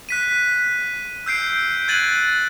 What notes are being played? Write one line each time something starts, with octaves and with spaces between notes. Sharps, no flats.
F#6 B6 D#7
E6 G6 C7 D7
F#6 G#6 A6 D#7 F#7